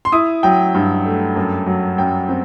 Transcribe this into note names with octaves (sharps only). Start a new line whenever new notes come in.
C6
E4 D#6
F#3 G5
G2
A3
F#2
F#3
F#2 G5
C4